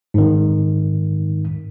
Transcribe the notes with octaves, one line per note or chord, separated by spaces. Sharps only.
G#2 D#3